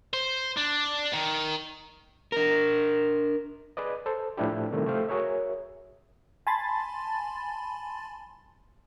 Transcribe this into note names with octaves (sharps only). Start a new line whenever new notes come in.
C5
D4
D#3
D4 A#4
G#4 B4 D5 D#5
A4 C5
A2 F3 A3 D4 E4 G4
C3 D#3 G3 A3
F3 A3 G4 C5 F5
F#4 G#4 A#4 C#5 E5
G#5 A5 B5 C6 A6